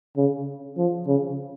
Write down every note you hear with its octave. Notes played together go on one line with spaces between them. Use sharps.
C#3
F3
C#3